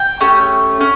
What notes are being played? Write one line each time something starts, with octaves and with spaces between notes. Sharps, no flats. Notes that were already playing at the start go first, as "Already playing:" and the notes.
Already playing: G5
A3 C#4 G4
C#4